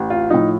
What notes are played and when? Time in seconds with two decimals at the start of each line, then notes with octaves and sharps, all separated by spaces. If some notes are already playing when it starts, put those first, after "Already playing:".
Already playing: A1
0.10 F4
0.30 A2 F3 D#4